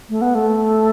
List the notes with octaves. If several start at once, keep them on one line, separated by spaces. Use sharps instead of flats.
A3
B3
A3